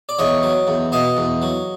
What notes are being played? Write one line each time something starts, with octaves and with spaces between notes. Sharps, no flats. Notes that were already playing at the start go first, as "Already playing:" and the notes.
D5
E2 C#5 D#5
F#3
E2
B2 D#5 F5
E2
F#3